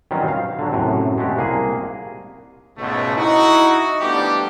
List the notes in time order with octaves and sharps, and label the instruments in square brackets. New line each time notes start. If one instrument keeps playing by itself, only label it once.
[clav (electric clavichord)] D#3 E3 F#3 G3 C4 C#4
F5
D3 F#3
F#2 A2 C3
G#3 A3 F#4 G4
C2 A#3 G#4
[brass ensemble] C#2 G#2 B2 A3
D#4 E4 F#4
F3 G3 A3 B3 D4 G4